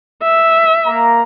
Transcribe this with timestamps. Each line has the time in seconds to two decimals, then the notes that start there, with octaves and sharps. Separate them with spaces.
0.23 E5
0.86 A#3 A#5